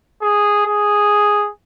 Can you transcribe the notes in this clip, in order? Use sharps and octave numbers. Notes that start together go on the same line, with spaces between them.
G#4
G#4